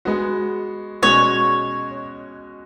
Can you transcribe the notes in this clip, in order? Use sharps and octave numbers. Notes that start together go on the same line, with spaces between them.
G#3 B3 F#4
B2 G#3 C#4 F#4 C#5